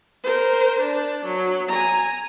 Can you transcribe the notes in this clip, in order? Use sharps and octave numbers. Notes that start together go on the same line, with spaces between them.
A#4 C5
D4
F#3
G#5 A#5